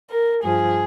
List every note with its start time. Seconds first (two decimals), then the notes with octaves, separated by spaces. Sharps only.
0.09 A#4
0.43 G2 F3 G#4